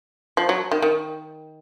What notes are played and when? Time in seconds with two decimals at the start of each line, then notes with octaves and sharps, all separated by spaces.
0.37 F3
0.49 F#3
0.71 D#3
0.82 D#3